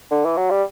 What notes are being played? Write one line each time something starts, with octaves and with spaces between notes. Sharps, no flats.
D3
E3
F#3
G3